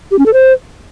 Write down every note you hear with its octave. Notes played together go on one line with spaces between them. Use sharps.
G4
C#4
A4
C5